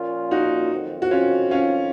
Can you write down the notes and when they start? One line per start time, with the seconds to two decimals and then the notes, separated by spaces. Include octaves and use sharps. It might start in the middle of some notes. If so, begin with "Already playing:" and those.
Already playing: A#2 F3 A#3 C#4 F4
0.31 D#4 F#4
0.71 F2 D#3 F#3 C4
1.02 F#4
1.11 C#4 F4
1.51 C#4 F4